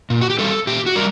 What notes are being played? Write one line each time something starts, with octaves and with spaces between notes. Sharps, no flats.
A#2
F#4
G4
G3 C4 A4
A#2 G4
F#4
G3 A#4